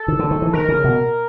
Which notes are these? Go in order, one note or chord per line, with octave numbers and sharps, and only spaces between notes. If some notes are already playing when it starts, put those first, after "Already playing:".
Already playing: A4
D#3
D3
D#3
E3
D#3 A#4
C#3
B2